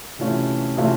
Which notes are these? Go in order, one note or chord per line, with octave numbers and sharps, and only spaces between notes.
C3 E3 A3 C#4 F4
C3 E3 A3 C#4 F4